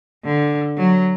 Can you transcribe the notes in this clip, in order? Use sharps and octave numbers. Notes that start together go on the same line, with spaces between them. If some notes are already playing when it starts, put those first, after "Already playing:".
D3
F#3